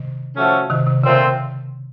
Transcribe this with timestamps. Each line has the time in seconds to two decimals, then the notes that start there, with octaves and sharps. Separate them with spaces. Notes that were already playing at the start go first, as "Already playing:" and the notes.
Already playing: C3 D#3
0.37 F3 A3 C#4 F#4 A4
0.70 C3 D#3
0.87 C3
1.03 A#2 C#3 A3 C4 F4